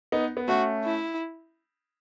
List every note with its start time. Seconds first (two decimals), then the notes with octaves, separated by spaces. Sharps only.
0.12 B3 D#4
0.37 B3
0.48 A3 C#4 F#4
0.84 E4